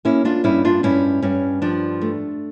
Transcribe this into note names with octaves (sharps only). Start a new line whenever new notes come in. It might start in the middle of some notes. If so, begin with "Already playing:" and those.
A#3 C#4 E4
D4 F4
G2 C#4 E4
D4 F4
G2 C#4 E4
G2 C#4
F3 D4
A3